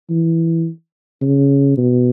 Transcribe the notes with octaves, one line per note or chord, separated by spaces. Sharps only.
E3
C#3
B2